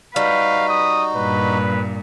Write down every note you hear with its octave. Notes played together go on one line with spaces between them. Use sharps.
G3 D#4 F#4 B4 F5
D#6
G2 A#2 B4